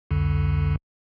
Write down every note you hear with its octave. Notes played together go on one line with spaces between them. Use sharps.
C2 F2 D3